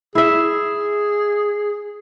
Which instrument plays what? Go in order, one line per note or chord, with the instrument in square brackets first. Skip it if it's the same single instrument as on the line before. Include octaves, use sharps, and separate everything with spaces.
[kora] E4 E5 [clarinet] G#4